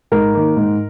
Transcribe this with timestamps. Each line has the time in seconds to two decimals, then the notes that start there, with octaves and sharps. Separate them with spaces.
0.12 G#2 A#4
0.35 D#3 A#3
0.57 G#2